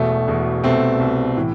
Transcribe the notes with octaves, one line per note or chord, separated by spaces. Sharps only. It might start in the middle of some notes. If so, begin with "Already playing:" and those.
Already playing: E1 E2 B2 A3
E1 E2 B2
C2 B2 A3 C4
C2 B2
A2 E3